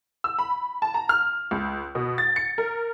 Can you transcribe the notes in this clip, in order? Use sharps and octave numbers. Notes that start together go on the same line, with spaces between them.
E6
B5
A5
A#5
F6
C#2
B2
A6
C#7
A#4